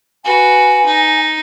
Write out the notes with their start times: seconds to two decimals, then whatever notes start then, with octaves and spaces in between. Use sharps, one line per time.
0.25 F#4 B4 G#5
0.86 D#4